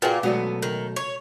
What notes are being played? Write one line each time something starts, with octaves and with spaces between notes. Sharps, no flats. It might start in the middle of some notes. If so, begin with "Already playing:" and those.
A#2 A#3 F#4 G#4 B4 G5 G#5
B2 F#3 G#3 A3 B3 F#4 D5
D#3
C#5